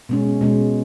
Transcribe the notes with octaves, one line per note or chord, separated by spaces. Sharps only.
B2 G#3 C#4
B2 G#3 C#4